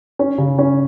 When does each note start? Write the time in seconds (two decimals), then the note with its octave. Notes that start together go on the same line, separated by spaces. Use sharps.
0.19 C#4
0.38 C#3
0.58 C#4